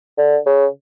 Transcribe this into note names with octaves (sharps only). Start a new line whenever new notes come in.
D3
C#3